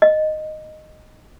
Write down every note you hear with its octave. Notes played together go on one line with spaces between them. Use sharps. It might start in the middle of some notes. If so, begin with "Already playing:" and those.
D#5